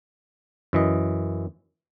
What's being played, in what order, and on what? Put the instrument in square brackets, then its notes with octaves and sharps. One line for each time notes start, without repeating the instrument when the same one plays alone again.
[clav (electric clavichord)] F#2 E3 D#5